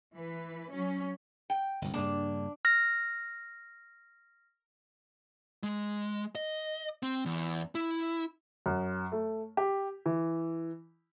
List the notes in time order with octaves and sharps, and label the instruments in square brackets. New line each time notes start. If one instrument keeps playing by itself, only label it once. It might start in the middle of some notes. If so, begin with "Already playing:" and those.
[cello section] E3 B4
F#3 C#4
[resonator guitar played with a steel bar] G5
[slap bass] G1 C2
[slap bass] G2 C#3 A#3 [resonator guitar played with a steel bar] D4
[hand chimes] F6 A#6
[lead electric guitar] G#3
D#5
C4
E2
E4
[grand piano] F#2
A3
G4
E3